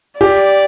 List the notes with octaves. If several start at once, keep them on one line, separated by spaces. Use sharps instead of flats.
G4 D5